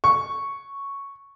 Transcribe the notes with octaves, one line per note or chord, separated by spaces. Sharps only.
C#6